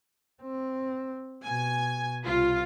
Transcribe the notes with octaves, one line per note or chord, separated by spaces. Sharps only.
C4
B2 G#5
C2 F4